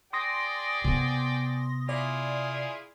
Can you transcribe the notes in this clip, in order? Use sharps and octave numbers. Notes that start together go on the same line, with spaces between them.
G#4 D5 G5 C6 D#6 A#6
C3 B3
E4 F4 G#4 D5